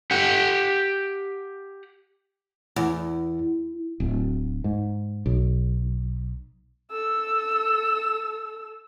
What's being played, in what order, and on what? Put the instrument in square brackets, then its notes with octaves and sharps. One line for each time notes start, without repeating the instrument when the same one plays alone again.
[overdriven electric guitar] G4 F#5
[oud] E2
[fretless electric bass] D1
G#2
B1
[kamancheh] A4 E6